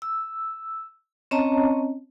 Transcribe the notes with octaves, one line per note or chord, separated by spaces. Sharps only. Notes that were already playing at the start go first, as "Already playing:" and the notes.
E6
C4 C#4 C#5 D#5 A5 A#5